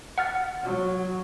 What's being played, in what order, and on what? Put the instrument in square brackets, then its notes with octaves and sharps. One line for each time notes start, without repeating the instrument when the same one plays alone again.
[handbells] F#5 F6 A6
[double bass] F#3